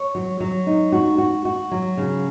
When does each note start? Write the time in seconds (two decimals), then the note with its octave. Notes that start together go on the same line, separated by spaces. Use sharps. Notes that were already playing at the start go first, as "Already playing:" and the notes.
Already playing: C#5
0.15 F#3
0.40 F#3
0.67 D#4
0.92 F#4
1.18 F#4
1.45 F#4
1.71 F#3
1.97 C#3